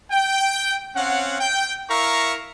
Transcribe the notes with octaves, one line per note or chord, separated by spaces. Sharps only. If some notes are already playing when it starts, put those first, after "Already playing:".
G5
C4 C#4 F5 F#5
G5
E4 A#4 E5 F5 A#5 C#6